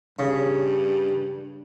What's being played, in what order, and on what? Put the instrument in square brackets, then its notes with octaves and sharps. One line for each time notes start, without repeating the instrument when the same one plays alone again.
[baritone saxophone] G2 [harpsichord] C#3